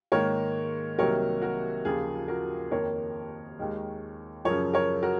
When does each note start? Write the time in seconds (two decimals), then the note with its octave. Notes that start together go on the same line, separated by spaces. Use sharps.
0.12 G#2 D#3 A#3 A#4 C#5
0.98 C2 C3 D#3 F#3 A#3 A#4 C#5
1.42 F#4 A#4
1.85 D#2 C#3 F3 A#3 F4 G#4
2.28 F#4 A#4
2.71 F2 D#3 A#3 A#4 C#5
3.59 D#2 D#3 G#3
4.45 F#2 C#3 F3 A#4 C#5
4.74 A#4 C#5
5.03 F#4 A#4